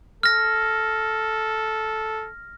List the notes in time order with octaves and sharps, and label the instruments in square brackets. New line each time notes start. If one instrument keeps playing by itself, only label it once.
[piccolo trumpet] A4 [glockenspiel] F6 A#6